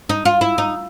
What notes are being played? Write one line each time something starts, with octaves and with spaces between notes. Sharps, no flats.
D#4
F4
E4
D#4